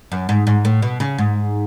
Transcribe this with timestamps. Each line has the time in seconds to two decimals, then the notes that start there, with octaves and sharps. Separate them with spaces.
0.12 F#2
0.29 G#2
0.47 G#2
0.65 A2
0.82 B2
1.00 C#3
1.18 G#2